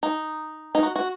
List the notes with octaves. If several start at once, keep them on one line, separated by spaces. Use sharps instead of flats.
D#4
D#4
F#4
F#4